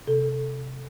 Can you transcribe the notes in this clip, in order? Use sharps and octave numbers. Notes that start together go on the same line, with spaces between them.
C3 A4